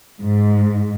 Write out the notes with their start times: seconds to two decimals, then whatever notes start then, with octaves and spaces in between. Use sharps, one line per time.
0.22 G#2